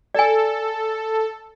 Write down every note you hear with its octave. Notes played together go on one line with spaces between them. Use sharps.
A4 D5 G#5